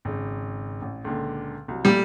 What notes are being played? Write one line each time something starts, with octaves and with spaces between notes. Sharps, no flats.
G#1 C#3
A1
C#2 A#2 D3
C2 F#3
A#2 G3 A3